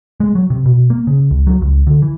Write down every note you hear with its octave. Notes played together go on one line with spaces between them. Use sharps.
G#3
F#3
C3
B2
A#3
C#3
C#2
F#3
C#2
D3
E3